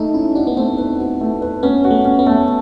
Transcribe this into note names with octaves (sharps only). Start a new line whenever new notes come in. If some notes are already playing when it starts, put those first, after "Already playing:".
Already playing: A3 D#4
C#4 E4
D4 F#4
B3
A3 C4
B4
F#4
A3
B4
B3 C#4
F#4
A3
C#4
B3
A3